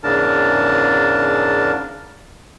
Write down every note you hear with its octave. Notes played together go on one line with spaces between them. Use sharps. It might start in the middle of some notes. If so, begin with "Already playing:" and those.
E2 G#2 C#3 D4 A#4 A5